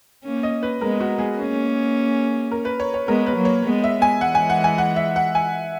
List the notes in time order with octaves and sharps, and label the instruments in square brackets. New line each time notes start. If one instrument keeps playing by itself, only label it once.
[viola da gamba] A#3 C#4
[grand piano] D#5
B4
[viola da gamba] G#3 B3 [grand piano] A#4
[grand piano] F#4
G#4
[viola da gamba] A#3 C#4
[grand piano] A#4
B4
C#5
C#5
[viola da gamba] G#3 B3 [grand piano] A#4
[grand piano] B4
[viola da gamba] F#3 A#3
[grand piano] C#5
[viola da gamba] G#3 B3
[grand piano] E5
G#5
[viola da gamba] E3 G#3 [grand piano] F#5
[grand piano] G#5
F#5
G#5
F#5
E5
F#5
G#5